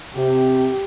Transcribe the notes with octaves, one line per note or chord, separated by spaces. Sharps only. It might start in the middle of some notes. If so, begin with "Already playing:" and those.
C3 G4